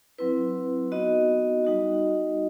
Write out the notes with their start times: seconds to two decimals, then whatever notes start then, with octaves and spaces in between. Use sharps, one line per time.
0.19 F#3 C4 E4 B4
0.92 B3 D#4 F#4 D#5
1.64 G3 D#4 F#4